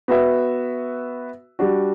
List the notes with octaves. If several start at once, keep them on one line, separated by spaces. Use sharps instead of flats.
B3 F#4 B4 E5
G3 D4 F#4